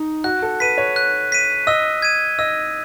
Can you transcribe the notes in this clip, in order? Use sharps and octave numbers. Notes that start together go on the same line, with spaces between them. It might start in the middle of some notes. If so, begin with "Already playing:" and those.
Already playing: D#4
F#4 F#6
A4
B4 B6 D#7
C#5
F#6
B6 D#7
D#5 E6
G#6 D#7
D#5 E6